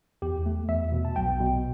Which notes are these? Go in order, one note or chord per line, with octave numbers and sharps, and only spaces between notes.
E2 G4
A3
E2 E5
B2
A5
B1 G5
B2